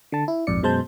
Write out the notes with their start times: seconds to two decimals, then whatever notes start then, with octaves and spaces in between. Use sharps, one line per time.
0.12 D3 A5
0.28 E4
0.47 A#1 F2 G#2 D5 C#7
0.63 F#2 B2 G#3 C5 A5 G6